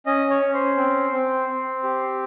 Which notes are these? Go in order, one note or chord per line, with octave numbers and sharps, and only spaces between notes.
C#4 D#5
C#5
C#4
C5
C4
C4
C4
G4